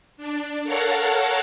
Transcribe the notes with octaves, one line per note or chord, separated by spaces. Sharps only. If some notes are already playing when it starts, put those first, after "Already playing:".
D4
A4 A#4 C#5 F5 F#5 A5